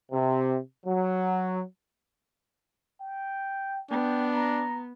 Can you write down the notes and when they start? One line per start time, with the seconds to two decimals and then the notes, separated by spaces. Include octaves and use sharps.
0.11 C3
0.85 F#3
3.01 G5
3.91 B3 D4 G5
4.32 A#5